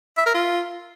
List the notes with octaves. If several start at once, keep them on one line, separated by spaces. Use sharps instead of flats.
E5
A#4
F4